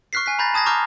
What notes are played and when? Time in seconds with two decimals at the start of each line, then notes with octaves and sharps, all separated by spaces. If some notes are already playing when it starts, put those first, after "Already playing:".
0.13 C#6 F6 F#6 B6 C7
0.26 G#5 F#6 B6
0.39 A#5 B5 G6 A6 A#6
0.54 A5 D#6 G#6 A#6
0.66 A#5 C#6 D6 F6 G6